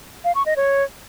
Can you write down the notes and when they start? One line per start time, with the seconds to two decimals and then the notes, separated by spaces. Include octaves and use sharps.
0.24 F5
0.35 C#6
0.46 D#5
0.57 C#5